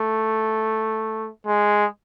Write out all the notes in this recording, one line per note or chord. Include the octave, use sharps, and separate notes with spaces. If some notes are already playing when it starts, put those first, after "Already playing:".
Already playing: A3
G#3